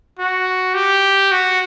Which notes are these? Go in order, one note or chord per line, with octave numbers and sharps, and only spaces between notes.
F#4
G4
F#4